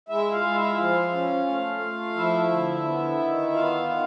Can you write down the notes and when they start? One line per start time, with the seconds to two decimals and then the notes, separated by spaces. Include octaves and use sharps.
0.09 G#3 E4 E5
0.32 F4 F5
0.44 G#3
0.55 E4 E5
0.78 F3 F4 F5
1.12 C#4
1.47 A3
1.81 A3
2.15 F3 E4 E5
2.50 D3
2.85 B3
3.19 D#3
3.54 B3 F4 F5
3.89 D#3